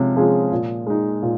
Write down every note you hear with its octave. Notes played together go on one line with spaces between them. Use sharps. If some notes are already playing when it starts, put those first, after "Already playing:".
Already playing: C3 F3 G#3 C#4
F3 G#3 C#4 G#4
A#2
G#3 D#4
A#2